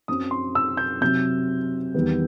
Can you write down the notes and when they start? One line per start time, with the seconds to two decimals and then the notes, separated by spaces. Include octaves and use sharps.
0.08 F#2 F#3 C4 D#6
0.31 C6
0.55 E6
0.77 G6
1.01 C3 F#3 C4 G6
1.94 E2 D#3 G3 B3